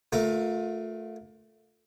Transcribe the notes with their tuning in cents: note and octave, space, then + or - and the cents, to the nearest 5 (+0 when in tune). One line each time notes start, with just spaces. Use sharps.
A3 +0 F4 +30 A#4 +5